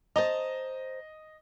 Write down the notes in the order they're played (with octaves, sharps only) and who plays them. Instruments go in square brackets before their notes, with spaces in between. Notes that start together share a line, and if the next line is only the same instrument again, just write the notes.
[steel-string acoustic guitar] C5 A5 A#5 [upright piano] D#5